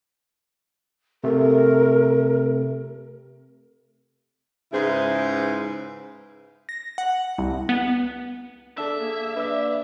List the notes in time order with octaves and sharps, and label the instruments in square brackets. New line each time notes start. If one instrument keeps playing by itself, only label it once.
[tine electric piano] C3 A3 [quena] A#4
[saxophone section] G#2 C#3 E4 G#4 B4 C5
[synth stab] A#6
F#5
C2
B3
[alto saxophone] D4 [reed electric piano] A4 A5 E6 [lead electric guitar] E5
[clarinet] A#3 [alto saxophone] G#4
[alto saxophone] D4 [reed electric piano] B4 D5 E6